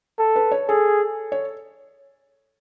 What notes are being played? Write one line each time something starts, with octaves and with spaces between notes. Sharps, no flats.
A4
B4
C#5
G#4 A4
C#5